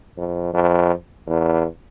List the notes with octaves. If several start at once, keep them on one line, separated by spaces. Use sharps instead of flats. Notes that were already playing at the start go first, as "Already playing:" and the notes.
F2
F2
E2